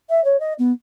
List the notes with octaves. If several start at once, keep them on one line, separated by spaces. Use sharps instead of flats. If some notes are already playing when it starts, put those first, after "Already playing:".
E5
C#5
D#5
B3